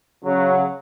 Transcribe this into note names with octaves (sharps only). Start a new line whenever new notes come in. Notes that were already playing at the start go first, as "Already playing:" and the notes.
C#3 F#3